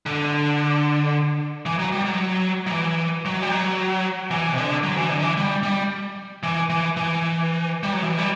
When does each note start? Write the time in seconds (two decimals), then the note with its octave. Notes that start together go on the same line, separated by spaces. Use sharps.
0.06 D3
1.66 E3
1.79 F#3
1.92 G3
2.05 F#3
2.67 F#3
2.71 E3
3.25 F#3
3.42 G3
3.51 F#3
4.31 E3
4.52 C3
4.58 D3
4.83 F#3
4.97 E3
5.10 D3
5.22 E3
5.37 G3
5.63 G3
6.43 E3
6.70 E3
6.97 E3
7.83 G3
7.93 F#3
8.02 E3
8.18 G3